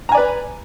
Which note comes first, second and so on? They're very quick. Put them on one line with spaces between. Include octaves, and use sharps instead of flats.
A#5 G#5 D5 B4